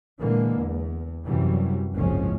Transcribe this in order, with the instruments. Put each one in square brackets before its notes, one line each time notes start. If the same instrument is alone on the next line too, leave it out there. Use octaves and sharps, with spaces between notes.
[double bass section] A#2 D3 E3 G#3 A#3
E2
F#2 C3 E3 F#3 G3
F#1 C2 G#2 F3 G#3 C#4